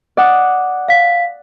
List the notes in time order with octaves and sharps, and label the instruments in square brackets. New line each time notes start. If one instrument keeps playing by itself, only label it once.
[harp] D5 F#5 D#6
[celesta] F5 B6